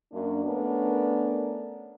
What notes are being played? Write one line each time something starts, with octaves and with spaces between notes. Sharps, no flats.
F#2 A#3 D4
A3 B3 C#4 D4 A#4